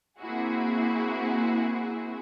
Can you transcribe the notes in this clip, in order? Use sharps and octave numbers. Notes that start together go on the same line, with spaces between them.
A#3 C4 E4 F#4 G#4